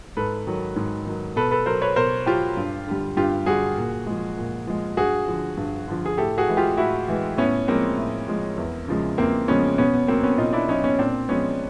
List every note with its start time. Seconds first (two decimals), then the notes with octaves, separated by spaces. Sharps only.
0.17 G#2 A4 B4
0.47 D#3 F#3
0.76 G#2
1.06 D#3 F#3
1.36 B2 A4 B4
1.51 A4 B4
1.66 F#3 A#4 C5
1.82 B4 C#5
1.96 B2 A#4 C5
2.26 F#3 F4 G4
2.57 G2
2.87 D3 G3
3.17 G2 F4 G4
3.46 D3 G3 F#4 G#4
3.77 A#2
4.07 F3 G#3
4.37 A#2
4.67 F3 G#3
4.97 G2 F#4 G#4
5.28 D3 F3
5.57 G2
5.88 D3 F3
6.06 G#4
6.17 A2 G4 A4
6.38 F#4 G#4
6.48 E3 G#3
6.57 F4 G4
6.77 A2 E4 F#4
7.08 E3 G#3
7.37 A2 B3 C#4
7.68 F3 G#3 A#3 C4
7.97 A2
8.28 F3 G#3
8.57 E2
8.88 C#3 F3 G#3
9.18 E2 A#3 C4
9.48 C#3 F3 G#3 B3 C#4
9.78 B2 B3 C#4
9.94 B3
10.08 F#3 A#3 C4
10.23 B3 C#4
10.38 B2 D#4 F4
10.53 D4 E4
10.68 F#3 C#4 D#4
10.84 B3 C#4
10.99 A#2 C4 D4
11.29 F3 G#3 B3 C#4